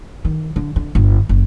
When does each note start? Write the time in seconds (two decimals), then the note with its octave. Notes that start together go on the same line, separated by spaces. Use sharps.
0.24 D#3
0.56 D3
0.76 D3
0.95 G1
1.29 F#1